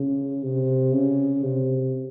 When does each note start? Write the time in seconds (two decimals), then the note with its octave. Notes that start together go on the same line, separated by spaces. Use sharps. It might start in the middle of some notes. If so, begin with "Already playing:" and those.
Already playing: C#3
0.43 C3
0.92 C#3
1.43 C3